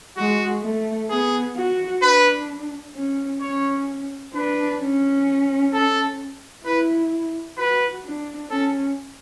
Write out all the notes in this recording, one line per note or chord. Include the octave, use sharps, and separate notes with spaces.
G#3 F#4
A3
B3 G#4
F#4
D4 B4
C#4
C#4 C#5
D4 B4
C#4
A4
E4 B4
F#4 B4
D4
C#4 A4